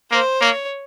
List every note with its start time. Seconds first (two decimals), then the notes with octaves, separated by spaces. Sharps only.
0.11 A#3 C5
0.41 A#3 C#5